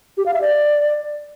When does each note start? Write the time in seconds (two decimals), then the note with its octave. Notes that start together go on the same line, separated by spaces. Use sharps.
0.17 G4
0.26 F5
0.34 E5
0.41 D5